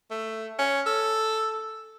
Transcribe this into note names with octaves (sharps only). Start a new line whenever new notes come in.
A3
C#4
A4